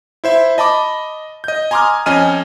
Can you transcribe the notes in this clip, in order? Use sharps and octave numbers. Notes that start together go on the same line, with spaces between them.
E4 C5 E5
D#5 A5 B5 D6
D#5 G6
G#5 A#5 C6 D6 D#6 F6
F2 C#4 D#5 G#5 F6 D#7